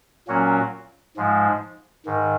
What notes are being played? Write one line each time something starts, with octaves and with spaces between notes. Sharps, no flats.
A#2 F#3 A#3 C#4 F#4
G#2 F3 G#3
G#2 D#3